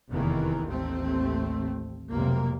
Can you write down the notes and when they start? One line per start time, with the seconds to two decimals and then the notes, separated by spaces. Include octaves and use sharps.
0.11 F1 E2 D#3 E3 A#3
0.66 A1 D#2 A3 C4
2.10 F1 B1 C3 A#3